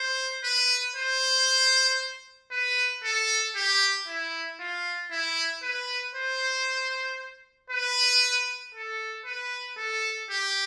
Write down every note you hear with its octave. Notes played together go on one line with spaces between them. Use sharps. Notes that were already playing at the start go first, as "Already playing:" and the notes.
Already playing: C5
B4
C5
B4
A4
G4
E4
F4
E4
B4
C5
B4
A4
B4
A4
G4